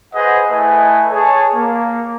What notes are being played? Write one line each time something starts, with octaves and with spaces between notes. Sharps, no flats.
G#4 B4 C5 D#5 F#5
A3 E4 A4 B4 D#5 G#5
G#4 C#5 A5
A#3